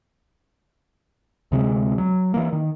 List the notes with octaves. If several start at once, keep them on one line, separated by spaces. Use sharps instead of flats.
D2 C3 G3 G#3
F#3
E3 A#3
D#3